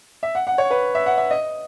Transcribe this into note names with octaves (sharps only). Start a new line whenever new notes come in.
E5
F#5
F#5
C#5
B4
E5
F#5
E5
D#5